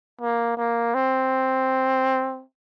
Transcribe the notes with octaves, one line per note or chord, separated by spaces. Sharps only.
A#3
A#3
C4